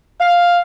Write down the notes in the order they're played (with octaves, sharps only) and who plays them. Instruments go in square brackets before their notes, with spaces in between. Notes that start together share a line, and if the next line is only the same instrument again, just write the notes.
[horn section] F5